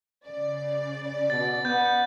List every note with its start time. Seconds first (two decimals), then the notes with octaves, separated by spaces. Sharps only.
0.25 C#3 D5
1.30 B2 A6
1.65 B3 G6